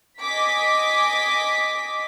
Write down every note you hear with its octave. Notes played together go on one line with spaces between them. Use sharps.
D#5 G#5 D6 B6